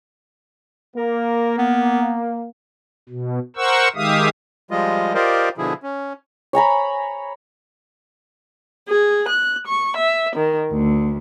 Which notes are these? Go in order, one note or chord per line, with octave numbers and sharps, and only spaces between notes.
A#3 A#4
B3
B2
A#4 C5 F#5 C#6 E6
D#3 G#3 G4 E5 F5 D#6
F3 G3 G#3 F4 D#5
F4 G4 A#4 C5 D5 D#5
B2 D3 F3 E4 G#4
C#4
C#5 G#5 A#5 B5
G#4
F#6
C#6
E5
D#3
D2